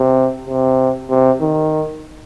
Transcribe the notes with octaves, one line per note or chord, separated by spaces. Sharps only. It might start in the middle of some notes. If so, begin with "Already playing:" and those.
Already playing: C3
C3
C3
D#3